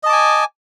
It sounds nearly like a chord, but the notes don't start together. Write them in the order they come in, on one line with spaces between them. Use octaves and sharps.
D#5 A5 D6 G#5